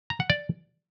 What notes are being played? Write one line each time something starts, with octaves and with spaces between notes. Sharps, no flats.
A#5
F#5
D5